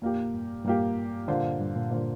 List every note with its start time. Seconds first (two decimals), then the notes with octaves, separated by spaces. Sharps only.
0.02 F2 A#2 A#3 G4
0.34 G2
0.65 G2 A#2 A#3 G4
1.28 A#2 D3 A#3 F4 C5
1.43 G2
1.60 G2
1.76 A#2
1.91 A#2 D3 A#3 F4 C5